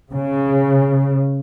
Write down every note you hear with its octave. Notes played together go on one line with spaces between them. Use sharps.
C#3